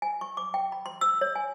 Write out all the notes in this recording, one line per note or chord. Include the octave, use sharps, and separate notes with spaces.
G#5
C#6
D6
G5
B5
C6
E6
C#5
G#5